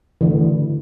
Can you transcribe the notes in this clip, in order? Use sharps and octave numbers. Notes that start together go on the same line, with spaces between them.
D3 E3